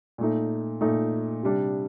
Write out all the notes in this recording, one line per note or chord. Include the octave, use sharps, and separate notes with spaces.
A#2 A3 D#4
A#2 A3 D#4
C3 G3 D4